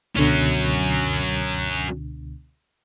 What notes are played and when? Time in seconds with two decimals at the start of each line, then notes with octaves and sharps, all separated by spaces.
0.16 C#2 B2 D3 F#3 C#4